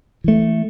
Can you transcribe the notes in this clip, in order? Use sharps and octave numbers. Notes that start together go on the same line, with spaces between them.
E3 A3